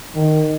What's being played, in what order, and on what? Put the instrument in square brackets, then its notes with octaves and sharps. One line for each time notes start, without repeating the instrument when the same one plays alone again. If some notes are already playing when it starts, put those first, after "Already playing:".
[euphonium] D#3